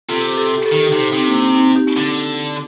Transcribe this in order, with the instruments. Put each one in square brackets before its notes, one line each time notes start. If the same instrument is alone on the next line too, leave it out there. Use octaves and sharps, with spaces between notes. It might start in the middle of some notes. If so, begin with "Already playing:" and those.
[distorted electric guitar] C3 [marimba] F4 A4
[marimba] G4
A4
G4
A4
G4
A4
[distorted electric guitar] D#3 [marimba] G4
[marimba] A4
D#4 G4
[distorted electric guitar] C3
[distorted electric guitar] C3 [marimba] C4 D#4
[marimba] A#3 D4
C4
C4 D#4
D#4 G4
[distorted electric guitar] D3